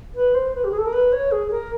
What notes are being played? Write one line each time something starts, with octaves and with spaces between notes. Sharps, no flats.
B4
C5
B4
G4
G#4
A4
A#4
B4
C#5
G#4
A#4